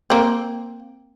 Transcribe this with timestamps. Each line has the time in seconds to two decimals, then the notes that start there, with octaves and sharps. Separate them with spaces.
0.10 A#3 C4